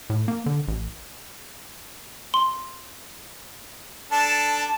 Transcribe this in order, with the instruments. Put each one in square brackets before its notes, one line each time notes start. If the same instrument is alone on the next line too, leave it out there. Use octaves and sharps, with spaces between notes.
[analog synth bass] A2
A#3
D3
A1
[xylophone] C6
[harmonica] D4 A4 [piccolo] A5